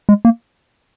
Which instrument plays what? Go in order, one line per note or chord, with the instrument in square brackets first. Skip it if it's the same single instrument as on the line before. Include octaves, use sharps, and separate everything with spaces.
[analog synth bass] G#3
A#3